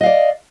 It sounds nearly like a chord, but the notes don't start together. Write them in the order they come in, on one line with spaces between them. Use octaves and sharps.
D#5 F5 D5